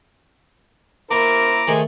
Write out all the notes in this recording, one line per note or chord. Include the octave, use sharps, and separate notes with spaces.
A#3 E4 A#4 C5 A#5 D6
D#3 A3 D#4 G#4 C5